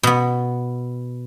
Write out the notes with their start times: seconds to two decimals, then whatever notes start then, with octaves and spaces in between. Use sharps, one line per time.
0.03 B2 B3